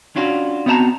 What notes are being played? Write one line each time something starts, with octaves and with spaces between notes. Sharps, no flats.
C#4 D4 F4 F#4
B3 C4 F#4 D#5 A5 A#5